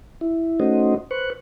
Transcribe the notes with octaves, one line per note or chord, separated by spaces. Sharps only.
E4
A3 C#4 D#4 F#4 C5 D#5
B4 C5 C#6 F#6